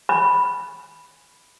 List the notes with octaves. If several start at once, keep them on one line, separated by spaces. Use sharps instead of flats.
B5